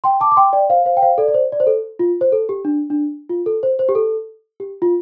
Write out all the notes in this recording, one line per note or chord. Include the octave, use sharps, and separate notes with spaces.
G5 C6
A5 D6
D6
G5 C6
D5 G5
C5 F5
C5 F5
G5
C5 F5
A4 D5
D5
C5
D5
C5
A4
F4
C5
A4
G4
D4
D4
F4
A4
C5
C5
G4
A4
G4
F4